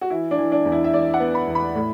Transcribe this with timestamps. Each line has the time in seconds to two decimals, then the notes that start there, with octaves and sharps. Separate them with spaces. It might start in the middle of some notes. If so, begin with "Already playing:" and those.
0.01 F#4
0.10 E3 E4
0.31 D4
0.38 E3
0.52 D4
0.65 E2
0.72 E4
0.84 E5
0.94 E2 D5
1.14 F#5
1.20 B3
1.35 B5
1.47 E2
1.55 B5
1.75 A2